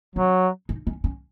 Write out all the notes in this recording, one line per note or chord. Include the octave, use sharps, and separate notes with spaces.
F#3 C#4
D#4
C#4
C#4